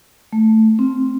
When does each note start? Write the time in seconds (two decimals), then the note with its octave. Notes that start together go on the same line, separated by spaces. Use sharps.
0.33 A3
0.79 C4